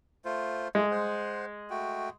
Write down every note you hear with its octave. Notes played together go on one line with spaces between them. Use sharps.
A3 F4 C5
G#3 A3
C5 F#5
A3 F#4 G5